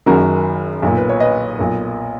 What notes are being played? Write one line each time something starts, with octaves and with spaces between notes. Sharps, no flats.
F#1 F#2 D#3 F#4 A#4
B1 A#2
B4
C#5
B4 D#5
B1 A#2